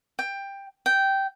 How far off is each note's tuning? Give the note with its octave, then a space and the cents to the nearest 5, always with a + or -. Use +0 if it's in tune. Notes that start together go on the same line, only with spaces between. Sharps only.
G5 +15
G5 -10